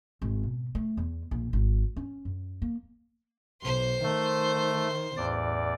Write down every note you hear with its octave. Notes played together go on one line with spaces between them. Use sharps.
G#1
B2
A3
E2
A#1
G#1
C#4
F#2
A#3
B1 C5 C6
D#3 A3
A1 E2 D5